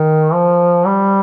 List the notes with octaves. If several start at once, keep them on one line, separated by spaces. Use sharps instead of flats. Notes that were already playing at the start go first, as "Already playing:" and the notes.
Already playing: D#3
F3
G3